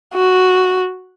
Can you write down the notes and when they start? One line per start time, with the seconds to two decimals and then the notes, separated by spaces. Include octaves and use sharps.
0.14 F#4